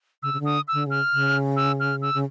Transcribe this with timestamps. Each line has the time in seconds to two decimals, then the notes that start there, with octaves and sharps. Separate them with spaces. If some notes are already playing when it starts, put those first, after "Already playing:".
0.23 C#3 E6
0.33 C#3
0.40 D3
0.45 D#6
0.68 E6
0.73 D3
0.86 C#3 F6
1.13 C#3
1.57 E6
1.80 F6
2.02 E6
2.14 C#3